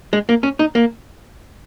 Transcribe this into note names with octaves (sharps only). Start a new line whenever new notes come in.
G#3
A#3
C#4
D#4
A#3